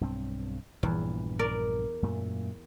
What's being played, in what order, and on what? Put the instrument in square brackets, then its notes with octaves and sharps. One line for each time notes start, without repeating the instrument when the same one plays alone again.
[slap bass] B1 G2 C4
[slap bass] A#1 G2 A#2 [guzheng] E2
[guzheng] A#4 D5
[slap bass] F#2 A#2 A3